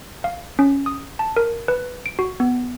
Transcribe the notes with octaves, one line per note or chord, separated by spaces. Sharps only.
F5
C#4
D#6
A5
A#4
B4
D7
F#4
B3